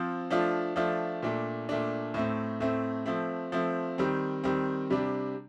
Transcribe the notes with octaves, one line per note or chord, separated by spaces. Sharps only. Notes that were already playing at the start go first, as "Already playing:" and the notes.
Already playing: F3 C4 F4
F3 A3 D4 F4
F3 A3 D4 F4
A#2 A3 D4
A#2 A3 D4
A2 A3 C4
A2 A3 C4
F3 A3 C4
F3 A3 C4
D#3 G3 C4
D#3 G3 C4
C3 G3 D4